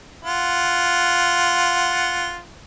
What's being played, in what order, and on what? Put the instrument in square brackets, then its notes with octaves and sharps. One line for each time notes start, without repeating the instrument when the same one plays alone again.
[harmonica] F4 F#5